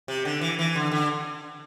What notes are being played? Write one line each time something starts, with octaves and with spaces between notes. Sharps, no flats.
C3
D3
E3
E3
D3
D3